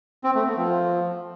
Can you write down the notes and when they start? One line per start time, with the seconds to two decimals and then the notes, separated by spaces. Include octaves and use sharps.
0.24 C4
0.35 A3
0.46 B3
0.57 F3